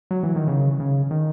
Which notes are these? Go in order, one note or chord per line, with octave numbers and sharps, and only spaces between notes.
F#3
E3
D#3
C#3
C#3
D#3